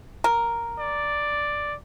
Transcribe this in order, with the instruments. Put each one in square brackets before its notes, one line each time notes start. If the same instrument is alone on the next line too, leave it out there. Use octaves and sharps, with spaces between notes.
[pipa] A#4
[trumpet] D5